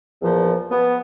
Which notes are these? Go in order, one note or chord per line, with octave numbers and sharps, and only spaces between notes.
E2 A#2 F3
B3